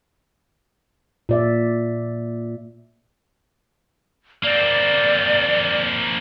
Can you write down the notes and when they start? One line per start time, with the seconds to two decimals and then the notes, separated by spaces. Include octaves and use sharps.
1.29 A#2 D5 E5
4.44 A#3 C4 D5